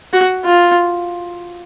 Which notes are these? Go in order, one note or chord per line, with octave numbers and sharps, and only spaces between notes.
F#4
F4